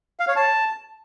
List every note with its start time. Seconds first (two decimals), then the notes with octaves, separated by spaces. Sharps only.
0.20 F5
0.28 C#5
0.36 A5